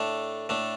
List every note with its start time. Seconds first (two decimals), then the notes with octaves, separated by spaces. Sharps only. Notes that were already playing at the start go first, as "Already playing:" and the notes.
Already playing: A2 A3 D4
0.49 A2 A3 D4